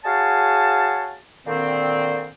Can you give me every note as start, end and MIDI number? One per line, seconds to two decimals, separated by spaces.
0.05 1.16 66
0.05 1.16 68
0.05 1.16 73
0.05 1.16 77
0.05 1.16 81
1.46 2.26 46
1.46 2.26 50
1.46 2.26 51
1.46 2.26 60